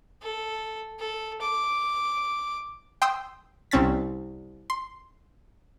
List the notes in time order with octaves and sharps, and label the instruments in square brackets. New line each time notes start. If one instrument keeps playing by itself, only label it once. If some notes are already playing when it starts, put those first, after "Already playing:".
[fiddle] A4
A4
D6
[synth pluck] G5 C6 D#6 E6 G6
C2 C4 C#4 A6 B6
C6